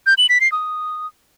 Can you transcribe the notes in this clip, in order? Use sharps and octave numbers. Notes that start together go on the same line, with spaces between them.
G6
F#7
B6
C7
D#6